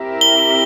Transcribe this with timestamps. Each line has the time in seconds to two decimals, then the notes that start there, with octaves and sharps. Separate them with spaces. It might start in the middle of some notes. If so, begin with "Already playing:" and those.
Already playing: C4 E4 G4 A#4 E5
0.21 G7